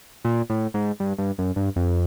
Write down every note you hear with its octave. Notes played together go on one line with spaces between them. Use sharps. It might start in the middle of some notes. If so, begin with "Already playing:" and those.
A#2
A2
G#2
G2
G2
F#2
G2
F2